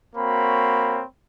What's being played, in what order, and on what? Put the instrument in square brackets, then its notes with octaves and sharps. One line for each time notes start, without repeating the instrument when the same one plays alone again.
[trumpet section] A#3 C4 F#4 C#5 B5